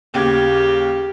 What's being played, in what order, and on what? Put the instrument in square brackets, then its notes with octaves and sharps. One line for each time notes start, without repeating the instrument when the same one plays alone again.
[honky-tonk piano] D#2 C#3 G#6 [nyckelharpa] G4